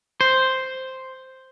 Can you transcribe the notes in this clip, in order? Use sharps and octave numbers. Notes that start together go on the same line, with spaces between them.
C5